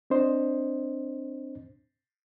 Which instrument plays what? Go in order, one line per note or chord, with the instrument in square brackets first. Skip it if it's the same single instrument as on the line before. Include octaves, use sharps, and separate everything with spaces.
[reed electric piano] C4 D4 C5 D#5